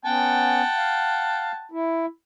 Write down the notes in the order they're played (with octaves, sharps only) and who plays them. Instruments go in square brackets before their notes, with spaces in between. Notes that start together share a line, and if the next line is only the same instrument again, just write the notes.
[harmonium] B3 C#4 [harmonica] F#5 G5 A5
[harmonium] F5
E4